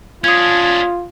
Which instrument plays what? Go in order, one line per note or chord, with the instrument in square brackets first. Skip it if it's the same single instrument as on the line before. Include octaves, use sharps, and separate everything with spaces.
[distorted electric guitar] C#4 D4 [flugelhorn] F4 [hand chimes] D#6 G#6